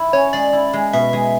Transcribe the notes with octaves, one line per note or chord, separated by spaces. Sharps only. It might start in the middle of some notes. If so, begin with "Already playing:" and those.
Already playing: E4
C#4 C#5
G#3 D5
E4
G#3
B2 E5
G#3